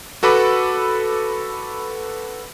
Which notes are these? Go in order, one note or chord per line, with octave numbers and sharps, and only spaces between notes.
F#4 A4 B4 B5 D6